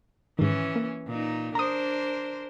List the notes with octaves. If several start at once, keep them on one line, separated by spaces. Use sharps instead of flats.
G#2 D#3 E3 C#4
A#3
A#2 D#4
D4 A#4 C5 A#5 D#6